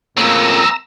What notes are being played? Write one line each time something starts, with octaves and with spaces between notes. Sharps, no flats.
F2 A2 C#3 G#3 A#3 B3 A#5 E6